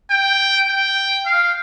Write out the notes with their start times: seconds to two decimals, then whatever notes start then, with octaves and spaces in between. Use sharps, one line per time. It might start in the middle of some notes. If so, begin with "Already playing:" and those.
0.10 G5
0.68 G5
1.26 F5